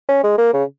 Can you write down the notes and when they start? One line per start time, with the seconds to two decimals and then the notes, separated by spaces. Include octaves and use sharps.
0.09 C#4
0.24 G#3
0.38 A#3
0.54 C#3